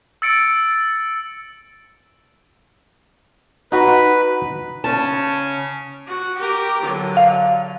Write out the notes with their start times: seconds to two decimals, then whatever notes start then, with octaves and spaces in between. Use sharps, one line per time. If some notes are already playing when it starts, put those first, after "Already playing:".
0.22 E6 A6 C#7 D7
3.72 D#4 F#4 B4
4.84 C#3 C#4 A5
6.08 F#4
6.38 G4 A#4
6.83 D3 F#3
7.17 F5